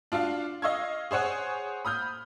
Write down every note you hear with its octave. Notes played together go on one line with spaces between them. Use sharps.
D4 F4 F#4 F5
D#5 F5 C#6 E6 G#6
G#4 C5 C#5 F#5 G#5
B5 D#6 F6 G6